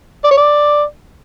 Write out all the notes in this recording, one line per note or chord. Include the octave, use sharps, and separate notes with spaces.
D5
C#5
D5